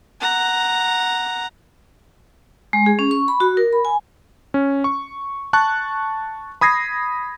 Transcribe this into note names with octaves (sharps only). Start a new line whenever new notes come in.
F#5 A#5
G#3
G#4
C#4
C#6
B5
F#4
A#4
B5
G#5
C#4
C#6
A5 C#6 F#6
B5 D#6 G#6 A#6 C7